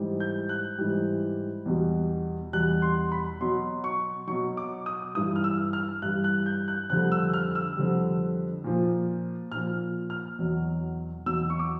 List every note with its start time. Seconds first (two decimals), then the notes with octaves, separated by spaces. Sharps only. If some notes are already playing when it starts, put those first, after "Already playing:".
Already playing: G#2 E3 G3
0.20 G6
0.49 F#6
0.78 G#2 E3 G3
1.66 E2 B2 G3
2.53 E2 B2 G3 F#6
2.82 C6
3.12 B5
3.41 B2 F#3 C6
3.84 C#6
4.27 F#3 C#6
4.32 B2
4.57 D6
4.86 D#6
5.15 G2 E3 G3 D#6
5.36 F6
5.44 E6
5.73 F6
6.02 G2 E3 G3 F#6
6.24 F#6
6.46 G6
6.68 F#6
6.90 F2 D3 G3 F#6
7.12 E6
7.33 F6
7.55 E6
7.77 F2 D3 G3
8.64 A#2 F3
9.52 A#2 F3 F6
10.10 F6
10.39 E2 B2 F#3
11.26 E2 B2 F#3 E6
11.50 C#6
11.59 D6